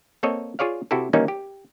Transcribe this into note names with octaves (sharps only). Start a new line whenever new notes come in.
A#3 C4 A4 C#5 D#5
F4 G#4 C#5 D5 F5
C3 E4 F#4 G4 A4
D#3 E3 G3 A#3 C#4 D#4
G4